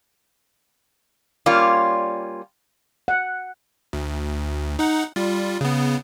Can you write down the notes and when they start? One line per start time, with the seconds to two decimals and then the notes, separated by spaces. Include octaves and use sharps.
1.46 G3 A#3 C#4 F4 D5
3.08 F#5
3.93 D2
4.79 D#4 F#5
5.16 G3 F4
5.61 C#3 B3